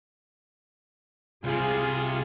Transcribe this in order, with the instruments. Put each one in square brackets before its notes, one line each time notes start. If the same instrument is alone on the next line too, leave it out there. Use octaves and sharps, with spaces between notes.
[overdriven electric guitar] C2 C3 [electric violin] F4 [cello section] G#4